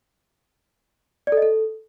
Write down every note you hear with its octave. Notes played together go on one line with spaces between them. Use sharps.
D5
A4
D#5
A4